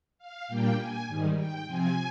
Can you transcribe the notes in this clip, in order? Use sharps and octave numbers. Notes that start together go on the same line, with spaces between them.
F5
A#2 G3 A#3 D4 G5
G#5
G#2 D#3 G3
G5
C3 F3 C4 G#5